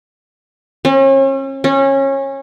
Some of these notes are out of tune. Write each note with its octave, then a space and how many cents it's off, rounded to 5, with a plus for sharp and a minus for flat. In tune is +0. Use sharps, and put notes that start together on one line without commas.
C#4 -40
C#4 -25